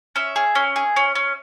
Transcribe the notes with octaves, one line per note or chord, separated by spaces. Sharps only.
C#4 E5
G#4
C#4
G#4
C#4
C#4